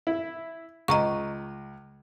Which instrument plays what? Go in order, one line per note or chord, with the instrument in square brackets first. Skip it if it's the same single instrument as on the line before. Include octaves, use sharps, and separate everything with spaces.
[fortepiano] E4
[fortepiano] C#2 [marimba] D#5 A#5 C#6